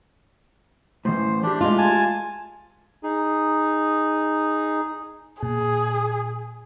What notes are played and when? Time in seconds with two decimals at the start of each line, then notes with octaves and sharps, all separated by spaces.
1.05 A2 C3 E3 C5
1.43 A3 D4 G4 D5
1.61 G#3 F4
1.78 G#5 A5
3.03 D#4 G#4
5.43 A#2 G#4